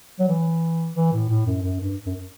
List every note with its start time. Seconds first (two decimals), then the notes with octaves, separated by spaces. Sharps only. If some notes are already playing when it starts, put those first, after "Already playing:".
0.19 F#3
0.28 E3
0.95 E3
1.13 A2
1.30 A2
1.47 F#2
1.63 F#2
1.80 G2
2.06 F#2